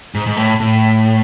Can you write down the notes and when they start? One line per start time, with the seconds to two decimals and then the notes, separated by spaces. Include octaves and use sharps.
0.15 G#2
0.27 G#2
0.37 A2
0.60 A2